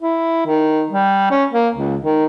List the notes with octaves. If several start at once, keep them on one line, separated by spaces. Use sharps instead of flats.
E4
D#3
G3
C#4
A#3
C#2
D#3